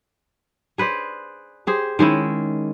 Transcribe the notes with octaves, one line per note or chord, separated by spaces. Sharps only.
G#4 B4 C5 D5
G4 G#4 C5
D#3 G#3 C#4 E4